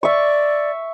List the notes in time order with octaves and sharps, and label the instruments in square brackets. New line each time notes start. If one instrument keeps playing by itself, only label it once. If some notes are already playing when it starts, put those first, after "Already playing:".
[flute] D5 [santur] E5 C#6